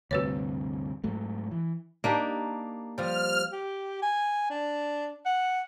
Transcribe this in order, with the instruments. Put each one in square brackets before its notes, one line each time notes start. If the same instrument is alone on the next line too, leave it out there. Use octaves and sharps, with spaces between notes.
[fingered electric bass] D2 G2 C3 [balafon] F#4 B4 C#5
[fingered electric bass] G#2 F#3 A3
E3
[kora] A#3 D4 G4 [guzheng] D#4
[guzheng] F3 G3 [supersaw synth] F6
[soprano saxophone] G4
G#5
D4
F#5